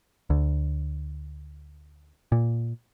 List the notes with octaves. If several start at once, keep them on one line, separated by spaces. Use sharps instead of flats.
D2
A#2